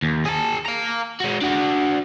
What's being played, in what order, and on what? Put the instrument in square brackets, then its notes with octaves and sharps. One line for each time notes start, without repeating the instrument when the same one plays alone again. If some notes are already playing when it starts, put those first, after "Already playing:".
[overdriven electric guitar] D#2
G#4 A5
F5 A#5
G#3 F#4
D4 F#4